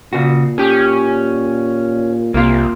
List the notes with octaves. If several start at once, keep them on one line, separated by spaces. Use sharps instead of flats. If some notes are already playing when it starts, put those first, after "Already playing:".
A#2 C#3 F#4
C#4 G4 G#4
C2 C3 A#3 F4